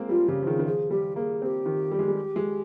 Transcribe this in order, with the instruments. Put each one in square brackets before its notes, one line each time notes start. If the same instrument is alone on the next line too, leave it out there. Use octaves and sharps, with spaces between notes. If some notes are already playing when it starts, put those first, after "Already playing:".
Already playing: [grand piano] G#3 A#3 C4
[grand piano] G3 [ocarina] F4
[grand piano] C#3 [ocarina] G4
[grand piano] F3
[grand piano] D#3 [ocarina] G#4
[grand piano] D#3
[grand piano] F3 [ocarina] G#4
[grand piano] G3 [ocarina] G4
[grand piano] A#3 [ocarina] G#4
[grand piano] C4 [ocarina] G4 G#4
[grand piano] D#3
G3
G#3
G3
G#3